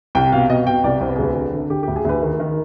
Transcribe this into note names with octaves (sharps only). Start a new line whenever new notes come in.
C2 G5
B2 F5
B2 D#5
B2 G5
C2 D5
C2 C5
B4
G#4
D2 B4
D3
D3
D3 G4
G4
D2
G#4
D2 B4
D#3
D#3